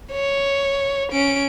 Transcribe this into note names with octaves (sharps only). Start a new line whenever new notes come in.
C#5
C#4 D7